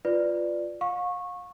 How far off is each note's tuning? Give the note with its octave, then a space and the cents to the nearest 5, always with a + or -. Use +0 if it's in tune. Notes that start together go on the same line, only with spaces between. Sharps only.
F4 +0 B4 +10 D5 +5
F5 +40 C#6 -15